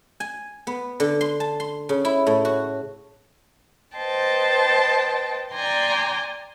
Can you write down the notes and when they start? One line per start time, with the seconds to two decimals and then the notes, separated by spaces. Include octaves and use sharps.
0.20 G#5
0.67 B3
1.00 D3
1.21 C6
1.40 A5
1.60 C6
1.89 C#3
2.05 E4
2.26 A2
2.45 F#4
3.96 B4 C5 D#5 G5 A5
5.52 D5 G5 G#5 A#5 C6